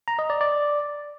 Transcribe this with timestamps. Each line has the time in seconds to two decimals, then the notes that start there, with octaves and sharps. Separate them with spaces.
0.08 A#5
0.19 D#5
0.30 D5
0.41 D5